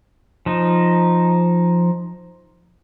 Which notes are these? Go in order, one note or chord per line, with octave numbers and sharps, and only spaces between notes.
F3 D#4